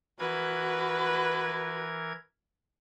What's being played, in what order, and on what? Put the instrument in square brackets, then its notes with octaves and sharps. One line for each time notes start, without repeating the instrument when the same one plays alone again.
[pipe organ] E3 A#4 G#6 [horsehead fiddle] F#4 B4